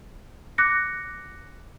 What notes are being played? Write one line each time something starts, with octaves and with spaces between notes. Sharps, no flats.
D6 F#6 A#6 C#7